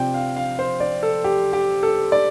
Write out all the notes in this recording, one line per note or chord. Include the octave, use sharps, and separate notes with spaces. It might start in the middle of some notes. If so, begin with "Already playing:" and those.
Already playing: C3 F3 C4 D5 G5
F5
F5
C5
D5
A4
G4
G4
A4
D5